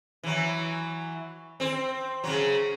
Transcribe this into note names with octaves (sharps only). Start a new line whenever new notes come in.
E3 F#3
C4 C5
C#3 F#3